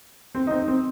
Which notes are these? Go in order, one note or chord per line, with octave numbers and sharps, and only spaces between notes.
C4
D#4
C4
C4